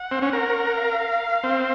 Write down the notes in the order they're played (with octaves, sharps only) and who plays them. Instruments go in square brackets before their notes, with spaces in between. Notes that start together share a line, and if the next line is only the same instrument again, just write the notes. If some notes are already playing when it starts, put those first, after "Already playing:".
Already playing: [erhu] F#5
[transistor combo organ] C4
C#4
A#4
[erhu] F5
[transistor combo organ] C4